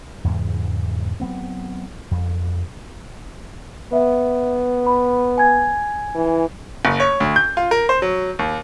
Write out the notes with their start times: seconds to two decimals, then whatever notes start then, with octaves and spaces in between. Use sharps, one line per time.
0.24 E2 G#2 C#3 G#3
1.20 F#3 B3 C4
2.11 F2
3.93 B3 E5
4.87 B5
5.38 G#5 G#6
6.15 E3
6.85 F#1
7.00 C#5
7.20 D2
7.36 G6
7.57 F4
7.71 A#4
7.89 C5
8.02 F#3
8.39 D#2